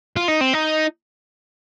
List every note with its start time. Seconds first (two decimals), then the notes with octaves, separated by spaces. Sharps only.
0.17 F4
0.28 D#4
0.41 C4
0.53 D#4